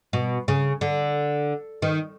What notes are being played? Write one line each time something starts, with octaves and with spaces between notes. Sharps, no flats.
B2
C#3
D3
D#3